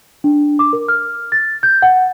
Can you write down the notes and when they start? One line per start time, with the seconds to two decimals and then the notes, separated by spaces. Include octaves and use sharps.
0.24 D4
0.59 D6
0.73 A#4
0.88 F6
1.32 A6
1.63 G6
1.82 F#5